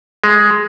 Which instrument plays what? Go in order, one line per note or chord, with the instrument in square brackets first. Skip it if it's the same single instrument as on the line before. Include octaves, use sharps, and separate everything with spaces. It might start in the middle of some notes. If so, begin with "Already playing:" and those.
[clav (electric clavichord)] G#3